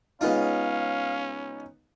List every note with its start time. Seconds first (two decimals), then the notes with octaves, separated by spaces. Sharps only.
0.21 C#3 G#3 B3 C#4 D#4 F4 F5